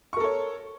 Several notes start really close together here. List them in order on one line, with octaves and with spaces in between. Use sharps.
C#6 A#4 A4 C#5